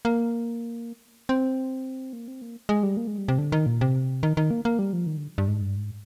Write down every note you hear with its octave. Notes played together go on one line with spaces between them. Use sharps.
A#3
C4
A#3
C4
A#3
G#3
G3
A#3
G#3
G3
C3
D3
D#3
A#2
C3
D#3
D#3
A#3
A#3
G3
F3
D#3
D3
G2
G#2
G2
G#2